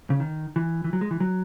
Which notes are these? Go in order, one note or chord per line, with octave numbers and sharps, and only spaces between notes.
C#3
D#3
E3
E3
F#3
G#3
E3
F#3